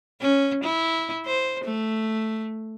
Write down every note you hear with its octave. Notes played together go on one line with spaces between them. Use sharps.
C#4
E4
C5
A3